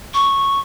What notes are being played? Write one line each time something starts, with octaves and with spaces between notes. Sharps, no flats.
C#6